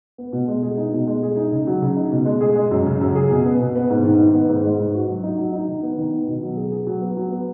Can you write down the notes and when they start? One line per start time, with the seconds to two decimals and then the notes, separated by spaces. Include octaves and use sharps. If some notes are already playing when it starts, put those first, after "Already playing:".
0.18 B3
0.33 B2
0.48 G#3
0.63 G#4
0.77 D#4
0.93 B2
1.07 G#3
1.23 G#4
1.36 D#4
1.52 C#3
1.67 F#3
1.82 C#3
1.96 D#4
2.12 B2
2.25 G#3
2.41 G#4
2.55 G#3
2.71 F#2
2.86 C#3
3.01 F#2
3.15 G#4
3.31 B2
3.45 B3
3.60 B2
3.75 B3
3.90 G#2
4.04 D#3
4.19 D#4
4.34 B3
4.49 G#2
4.64 G#3
4.79 G#2
4.94 F#4
5.08 F#3
5.23 D#4
5.39 F#3
5.53 D#4
5.68 D#3
5.83 B3
5.98 D#3
6.12 B3
6.27 B2
6.42 F#3
6.57 G#4
6.71 G#4
6.87 F#3
7.01 B3
7.17 F#3
7.32 B3